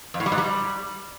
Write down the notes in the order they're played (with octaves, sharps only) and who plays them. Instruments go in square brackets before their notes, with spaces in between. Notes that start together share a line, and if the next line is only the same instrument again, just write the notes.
[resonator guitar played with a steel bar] F2
A2
G3
G#2
G3